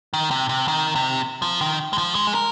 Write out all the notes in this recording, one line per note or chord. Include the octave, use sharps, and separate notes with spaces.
D#3
C3
C3
D#3
C3
F3
D#3
G#3
F3
G#3
G#4
A#4